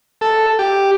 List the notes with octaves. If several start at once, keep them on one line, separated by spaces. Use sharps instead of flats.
A4
G4